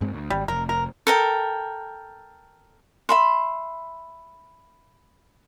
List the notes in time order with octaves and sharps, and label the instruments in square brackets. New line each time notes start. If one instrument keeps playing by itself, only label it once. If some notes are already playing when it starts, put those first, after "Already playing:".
[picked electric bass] G2 G#3 C4
D2
[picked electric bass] G#1 [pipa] G3
[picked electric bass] F1 [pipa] A#4
[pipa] A#4
[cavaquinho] A4 A#4 G5
E5 B5 C6